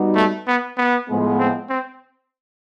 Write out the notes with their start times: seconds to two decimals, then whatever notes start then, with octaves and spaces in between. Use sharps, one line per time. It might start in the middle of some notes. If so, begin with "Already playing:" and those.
Already playing: G3 B3 D#4 F#4
0.16 A3
0.47 B3
0.78 B3
1.08 A2 F3 G#3 B3
1.39 C4
1.69 C4